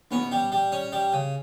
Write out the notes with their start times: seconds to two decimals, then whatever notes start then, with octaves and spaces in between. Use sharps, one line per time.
0.11 B3 C#4
0.32 G3
0.52 G3
0.72 C#4
0.92 G3
1.13 C#3